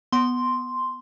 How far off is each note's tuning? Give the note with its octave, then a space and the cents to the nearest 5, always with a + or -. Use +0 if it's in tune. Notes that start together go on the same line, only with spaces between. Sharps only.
B3 +0 C6 +0